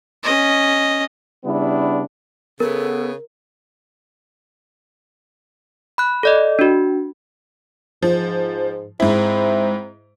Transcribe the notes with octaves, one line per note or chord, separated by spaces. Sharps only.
C#4 D#5
C#3 G3 B3 D4 E4
C#3 B3 A4 A#4
B5 F#6
A4 D5 D#5
D4 F#4
G#2 F3
G#2 C4 E4